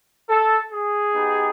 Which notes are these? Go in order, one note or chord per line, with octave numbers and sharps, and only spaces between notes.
A4
G#4
B3 D#4 G4